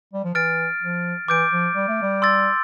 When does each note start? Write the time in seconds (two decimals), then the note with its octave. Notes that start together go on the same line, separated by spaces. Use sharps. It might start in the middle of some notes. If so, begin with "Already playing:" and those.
0.14 G3
0.24 F3
0.35 E3 F6 A6 D7
0.82 F3
1.28 E3 D6 G6 D7
1.52 F3
1.75 G3
1.88 A3
2.02 G3
2.22 C6 E6 A6